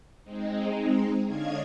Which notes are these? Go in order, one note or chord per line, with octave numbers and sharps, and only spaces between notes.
G#3 C4 D#4
D3 D4 C#5 D#5 F5 G#6